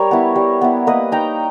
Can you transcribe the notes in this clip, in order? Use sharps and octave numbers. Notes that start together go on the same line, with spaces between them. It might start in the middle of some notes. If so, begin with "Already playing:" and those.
Already playing: G3 A#4 C#5
B3 E4
G3
B3 E4
A#3 B4 D#5
D#4 G5 A#5